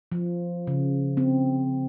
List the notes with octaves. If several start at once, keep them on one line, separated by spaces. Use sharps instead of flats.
F3
C#3
C4